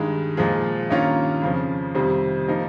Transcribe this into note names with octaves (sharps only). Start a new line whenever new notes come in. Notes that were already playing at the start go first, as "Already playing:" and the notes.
Already playing: G2 D#3 G#3
A#2 F3 G#3
G2 D#3 A#3 C#4 F4
F2 C#3 F3
F2 C3 D#3 G3 C4
F3 A#3 D#4